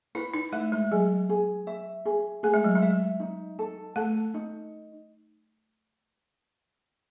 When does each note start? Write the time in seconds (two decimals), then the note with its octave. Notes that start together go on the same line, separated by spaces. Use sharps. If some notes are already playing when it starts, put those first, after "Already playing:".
0.15 E4 B4
0.34 D#4
0.52 A3 E5
0.72 G#3
0.91 F#3 G#4
1.29 G#4
1.67 E5
2.05 G#4
2.43 A3 G#4
2.54 G#3
2.64 F#3
2.75 G#3
2.82 E5
3.20 D#4
3.59 A4
3.96 A3 A4
4.34 D#4